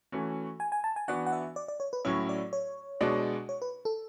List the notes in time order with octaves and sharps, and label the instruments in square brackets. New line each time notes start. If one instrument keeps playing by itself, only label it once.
[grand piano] E3 A3 C#4 F#4
[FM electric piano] G#5
G#5
A5
G#5
[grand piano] E3 B3 D4 F#4 [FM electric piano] F#5
[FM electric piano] F#5
E5
D5
D5
C#5
B4
[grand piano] A2 F#3 C#4 E4 [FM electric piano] C#5
[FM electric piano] D5
C#5
[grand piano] B2 G#3 D4 F#4
[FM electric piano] C#5
B4
A4